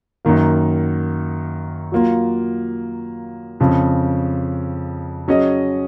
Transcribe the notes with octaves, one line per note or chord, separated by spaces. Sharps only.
F#2 D#3 A#3
F#3 A#3 F4
F2 C#3 F3
F#3 C#4 G#4 D#5